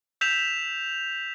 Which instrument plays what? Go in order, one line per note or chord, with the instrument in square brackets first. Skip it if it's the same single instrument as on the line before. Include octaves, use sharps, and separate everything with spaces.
[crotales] E6 G6 B6 E7 F7